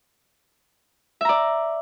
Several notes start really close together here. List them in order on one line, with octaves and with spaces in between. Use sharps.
E5 A#5 D5